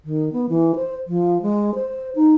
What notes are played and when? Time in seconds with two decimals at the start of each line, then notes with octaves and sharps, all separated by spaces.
0.05 D#3
0.33 B3
0.49 E3
0.75 C5
1.07 F3
1.42 G#3
1.75 C5
2.16 D#4